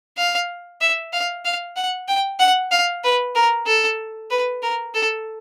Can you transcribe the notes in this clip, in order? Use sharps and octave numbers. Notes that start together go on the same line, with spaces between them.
F5
E5
F5
F5
F#5
G5
F#5
F5
B4
A#4
A4
B4
A#4
A4